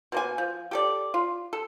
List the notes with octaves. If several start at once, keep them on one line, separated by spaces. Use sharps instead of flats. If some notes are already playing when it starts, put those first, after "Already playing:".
B2 A#3 G#5
F3
G4 A4 D5
F4
A4